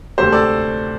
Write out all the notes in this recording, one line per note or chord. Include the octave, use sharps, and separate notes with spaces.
D2 C3 A3 G4 C5
A4 D5